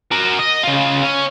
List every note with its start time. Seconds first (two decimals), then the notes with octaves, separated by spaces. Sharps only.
0.11 F#4 A#4
0.39 D#5
0.63 C#3 F4
1.04 C#4